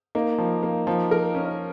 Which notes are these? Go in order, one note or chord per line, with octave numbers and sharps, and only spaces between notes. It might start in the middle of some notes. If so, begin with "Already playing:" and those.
A#3 D#4
F3
A#3
F3
A#4
C#4